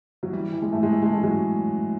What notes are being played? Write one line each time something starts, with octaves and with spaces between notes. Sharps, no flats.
F#3
E3 G3
E3
G#3
A2 A3
G#3
A2 A3
G#3
E3 A3
F#3 G#3